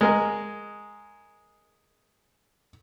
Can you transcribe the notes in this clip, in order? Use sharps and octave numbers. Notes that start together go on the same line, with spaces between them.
G#3 A#4 G#5